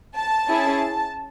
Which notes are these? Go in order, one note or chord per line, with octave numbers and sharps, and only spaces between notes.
A5
C#4 E4 G#4